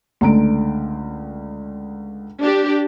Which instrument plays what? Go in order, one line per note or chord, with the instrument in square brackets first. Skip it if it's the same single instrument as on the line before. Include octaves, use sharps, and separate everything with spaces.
[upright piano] C#2 D3 D7 [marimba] A3 A#5
[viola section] D4 G4